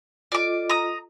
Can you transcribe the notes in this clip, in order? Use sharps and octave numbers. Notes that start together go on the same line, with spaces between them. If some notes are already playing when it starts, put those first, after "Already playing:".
F4 A4 D5 D#5 D6
A#5 D#6